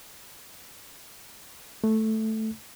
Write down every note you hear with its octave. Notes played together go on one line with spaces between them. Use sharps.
A3